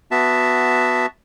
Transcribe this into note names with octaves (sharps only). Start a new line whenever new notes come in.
B3 F#4 E5 A5